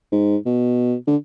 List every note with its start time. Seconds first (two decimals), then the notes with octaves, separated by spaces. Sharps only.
0.12 G#2
0.46 B2
1.07 D3